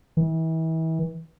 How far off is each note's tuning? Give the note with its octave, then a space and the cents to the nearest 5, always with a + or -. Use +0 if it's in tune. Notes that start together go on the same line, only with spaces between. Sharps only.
E3 -35